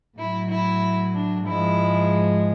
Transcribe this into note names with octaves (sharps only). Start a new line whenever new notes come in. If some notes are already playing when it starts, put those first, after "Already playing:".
A2 F#3 E4
E4
D4
G#2 F3 G#3 E4